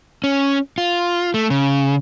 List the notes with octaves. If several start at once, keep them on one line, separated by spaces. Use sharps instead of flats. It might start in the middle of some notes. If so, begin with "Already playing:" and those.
C#4
F4
A3
C#3